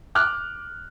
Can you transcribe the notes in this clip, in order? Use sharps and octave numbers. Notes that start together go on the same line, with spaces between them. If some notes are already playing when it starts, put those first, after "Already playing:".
D6 F6 F#6